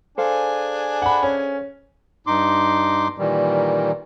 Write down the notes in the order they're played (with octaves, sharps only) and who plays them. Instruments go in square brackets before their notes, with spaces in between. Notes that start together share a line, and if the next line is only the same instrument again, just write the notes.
[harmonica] D4 G#4 G#5 [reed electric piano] A4 C5 F5
[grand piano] F#5 B5
C#4
[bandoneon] G2 D#4 C6 D6
A#2 D#3 E3 G3